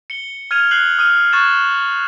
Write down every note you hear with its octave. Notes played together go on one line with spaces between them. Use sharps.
C#7 G7
F6 G#6 D#7 F7
F#6 C7 F#7 G7
D#6 F6 D#7 G7
C#6 F#6 G#6 A6 E7